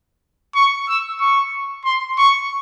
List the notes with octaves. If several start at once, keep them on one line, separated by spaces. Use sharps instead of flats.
C#6
E6
C#6
C6
C#6